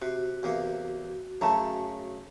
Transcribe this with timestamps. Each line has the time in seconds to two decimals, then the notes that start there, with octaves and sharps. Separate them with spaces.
0.02 C3 F#4
0.43 E2 C3 A#3
1.41 F#2 C#3 A3 A4 A5 A#5